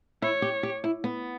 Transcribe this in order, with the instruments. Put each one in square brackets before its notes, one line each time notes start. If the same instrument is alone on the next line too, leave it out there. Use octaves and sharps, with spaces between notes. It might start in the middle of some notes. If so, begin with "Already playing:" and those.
[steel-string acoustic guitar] E4 [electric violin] C#5
[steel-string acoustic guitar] G4
G4
E4
B3